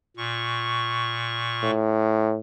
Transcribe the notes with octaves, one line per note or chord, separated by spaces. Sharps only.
A#2 C#6
A2